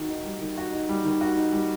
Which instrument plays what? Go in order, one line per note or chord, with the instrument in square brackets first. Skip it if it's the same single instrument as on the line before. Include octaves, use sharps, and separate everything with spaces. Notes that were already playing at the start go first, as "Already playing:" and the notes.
Already playing: [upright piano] D#3 F#4
D#4
G3
D#3
F#4
D#4
G3
D#3
F#4
D#4
G3